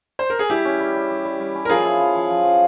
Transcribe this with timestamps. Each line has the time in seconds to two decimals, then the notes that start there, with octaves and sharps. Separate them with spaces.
0.19 C5
0.30 A#4
0.39 G#4
0.50 G3 E4 G4
0.65 C#4
0.80 G3
0.95 G3
1.10 G3
1.25 G3
1.40 G3
1.55 C#4
1.65 A#4
1.70 F3 F4 G#4
1.85 E4
2.00 F3
2.15 F3
2.30 F3
2.45 F3